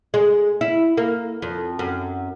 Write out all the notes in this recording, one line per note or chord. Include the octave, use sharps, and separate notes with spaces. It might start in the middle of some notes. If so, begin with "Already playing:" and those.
G#3
E4
A#3
F2
F#2